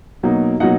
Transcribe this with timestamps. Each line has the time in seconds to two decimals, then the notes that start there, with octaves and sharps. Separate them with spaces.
0.23 B2 F#3 A#3 D#4
0.60 B2 F#3 A#3 D#4 F#5